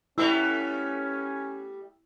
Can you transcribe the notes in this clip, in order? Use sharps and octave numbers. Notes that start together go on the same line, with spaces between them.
G3 A3 B3 C#4 E4 E6 F7